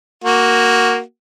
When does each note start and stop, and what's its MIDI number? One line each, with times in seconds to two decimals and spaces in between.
0.24 1.00 58
0.24 1.00 66